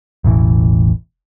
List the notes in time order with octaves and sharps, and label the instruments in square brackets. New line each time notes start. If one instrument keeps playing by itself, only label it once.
[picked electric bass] E1 A1 A2 E3